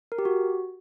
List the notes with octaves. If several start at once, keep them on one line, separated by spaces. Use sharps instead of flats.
A#4
G4
F#4